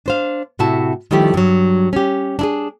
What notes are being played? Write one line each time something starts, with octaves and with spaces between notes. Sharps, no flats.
D4 C5 F5
A2 C3 E4 F#4 E5 A5
D#3 F3 G3 A3 E4 G4
G2 F#3
C#4 G4
D4 E4 G#4